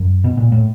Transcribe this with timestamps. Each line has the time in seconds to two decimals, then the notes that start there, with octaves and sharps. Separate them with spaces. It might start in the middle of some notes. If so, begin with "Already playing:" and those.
Already playing: F#2
0.24 B2
0.37 A#2
0.52 A2